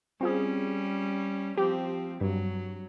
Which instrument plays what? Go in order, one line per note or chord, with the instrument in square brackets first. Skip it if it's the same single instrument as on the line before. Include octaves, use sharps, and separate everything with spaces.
[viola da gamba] G3 C#4 [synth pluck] C4 F4 G#4
[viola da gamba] F3 C4 [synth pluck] G4
[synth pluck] G2 [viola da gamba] F#3